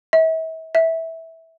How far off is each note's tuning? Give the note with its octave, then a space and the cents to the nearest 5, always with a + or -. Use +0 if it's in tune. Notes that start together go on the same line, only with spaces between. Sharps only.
E5 -40
E5 -15